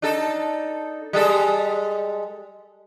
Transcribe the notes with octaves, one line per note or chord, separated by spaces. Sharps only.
D4 D#4 A4
G3 G#3 A4